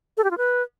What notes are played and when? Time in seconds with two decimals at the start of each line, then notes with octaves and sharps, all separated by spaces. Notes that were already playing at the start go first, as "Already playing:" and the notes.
0.17 A4
0.24 G4
0.31 F4
0.37 B4